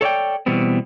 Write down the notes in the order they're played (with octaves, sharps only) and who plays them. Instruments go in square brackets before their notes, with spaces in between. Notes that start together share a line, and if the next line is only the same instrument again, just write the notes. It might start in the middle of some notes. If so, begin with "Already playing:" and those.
[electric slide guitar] A4 C#5 D5 G5
B2 E3 G3 B3 C4